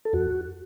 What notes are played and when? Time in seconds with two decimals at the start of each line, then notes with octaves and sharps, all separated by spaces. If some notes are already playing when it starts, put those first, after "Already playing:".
0.05 A4
0.13 F2 F#4